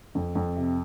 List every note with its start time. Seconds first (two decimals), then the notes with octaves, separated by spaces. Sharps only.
0.15 F2
0.35 F2
0.56 C3